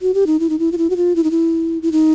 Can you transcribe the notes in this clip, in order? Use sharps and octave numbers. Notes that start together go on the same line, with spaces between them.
F#4
G4
D#4
E4
D#4
E4
F4
E4
F#4
F4
E4
D#4
E4
E4
D#4